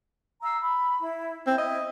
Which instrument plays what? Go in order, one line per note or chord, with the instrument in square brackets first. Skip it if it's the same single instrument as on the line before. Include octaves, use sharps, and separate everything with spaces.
[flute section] F5 A#5 E6
B5
E4
[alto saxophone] C4 [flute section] E4
[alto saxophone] D#5